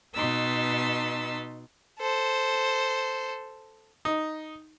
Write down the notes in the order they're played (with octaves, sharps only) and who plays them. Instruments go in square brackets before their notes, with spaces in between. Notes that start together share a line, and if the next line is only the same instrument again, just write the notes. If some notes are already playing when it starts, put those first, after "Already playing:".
[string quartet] B2 D#4 B4 C6 E6 A6
[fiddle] A4 C5
[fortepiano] D#4